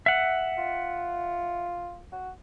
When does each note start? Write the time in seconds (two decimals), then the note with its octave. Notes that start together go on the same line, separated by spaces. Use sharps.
0.06 E5 F#5
0.58 F4
2.12 F#4